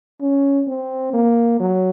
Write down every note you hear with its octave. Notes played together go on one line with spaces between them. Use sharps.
C#4
C4
A#3
F#3